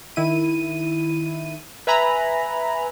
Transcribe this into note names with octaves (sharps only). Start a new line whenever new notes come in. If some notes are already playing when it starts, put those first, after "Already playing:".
D#3 E4 D#7
B4 E5 G#5 A#5 B5